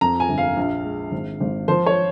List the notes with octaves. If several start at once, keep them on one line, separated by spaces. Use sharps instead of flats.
F2 A#5
G#5
G1
F5
A#1
G#3
G#1
G#1
F3 C5
C#5